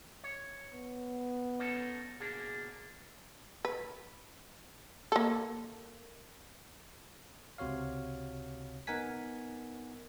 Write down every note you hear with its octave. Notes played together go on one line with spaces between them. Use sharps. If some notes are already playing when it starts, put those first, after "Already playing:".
C#5
B3
C#4 D#4 A4
B2 A#3 D4 G#4
B4
A#3 A4
C#2 C3 F#4 C#5 F5
B3 D#4 A#4 F#5 G#5 B6